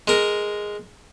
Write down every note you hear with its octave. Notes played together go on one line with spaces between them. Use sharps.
G#3 A#4